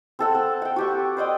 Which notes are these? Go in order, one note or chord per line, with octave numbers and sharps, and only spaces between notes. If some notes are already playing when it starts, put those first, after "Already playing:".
C4 A4 F#5
C4
F#5 G5
F#4 G4 C#6
C5 D5 D#5 G5